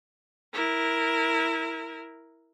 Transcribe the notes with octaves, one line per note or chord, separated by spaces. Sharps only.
E4 A#4